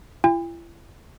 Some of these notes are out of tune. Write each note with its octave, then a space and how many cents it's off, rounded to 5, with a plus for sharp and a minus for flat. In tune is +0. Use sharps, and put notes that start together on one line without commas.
E4 +40 G5 +45